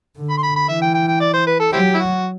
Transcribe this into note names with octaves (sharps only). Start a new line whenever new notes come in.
D3
B5
C6
B5
B5
E3 E5
G5
G5
G5
D5
C5
B4
A4
F#3 C4 E4 G4
E4
F#4